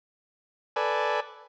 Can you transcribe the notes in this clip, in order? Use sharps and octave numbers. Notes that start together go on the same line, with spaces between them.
A4 B4 D5 G#5